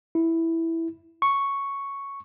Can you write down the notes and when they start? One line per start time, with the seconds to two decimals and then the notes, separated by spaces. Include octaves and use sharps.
0.15 E4
1.22 C#6